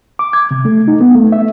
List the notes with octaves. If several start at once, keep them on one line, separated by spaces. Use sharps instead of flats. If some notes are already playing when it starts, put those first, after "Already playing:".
D6
G#6
C3
A3
D#4
B3
A3
E5